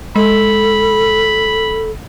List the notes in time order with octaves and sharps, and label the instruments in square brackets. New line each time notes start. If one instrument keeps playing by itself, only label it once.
[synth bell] G#3 [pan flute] A4 [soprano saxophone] B5